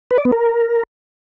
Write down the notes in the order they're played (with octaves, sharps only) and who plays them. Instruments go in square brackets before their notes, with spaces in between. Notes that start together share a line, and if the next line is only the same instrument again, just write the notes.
[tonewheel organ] B4
D5
B3
A#4